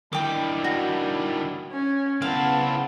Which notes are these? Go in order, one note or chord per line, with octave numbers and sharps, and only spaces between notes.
D#3 G3 D4 E4 G5 D6
F#4
C#4
C#3 B3 C4 E4 F5 A5